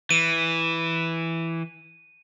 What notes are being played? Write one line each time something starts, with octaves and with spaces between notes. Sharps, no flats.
E3 D#7